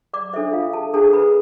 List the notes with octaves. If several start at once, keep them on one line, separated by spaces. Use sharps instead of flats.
D5 D6
D4 A4 C5 E5
F4 F5
A4 A5
D4 G#4 A4 C5 A5
B4 B5